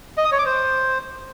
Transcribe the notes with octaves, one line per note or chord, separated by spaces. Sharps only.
D#5
D#6
C#5
D6
C5